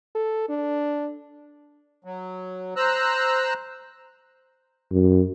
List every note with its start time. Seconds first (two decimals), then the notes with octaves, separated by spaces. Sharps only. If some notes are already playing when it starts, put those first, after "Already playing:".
0.15 A4
0.49 D4
2.04 F#3
2.76 C5 A#5 E6 F#6
4.91 F#2